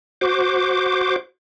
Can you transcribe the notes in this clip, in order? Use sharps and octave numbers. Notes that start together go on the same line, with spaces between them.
F#4 C5 D6